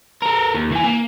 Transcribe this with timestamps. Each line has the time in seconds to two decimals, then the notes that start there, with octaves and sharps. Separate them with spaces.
0.22 A4 A#4
0.55 D#2
0.72 E3 G#5
0.84 A#3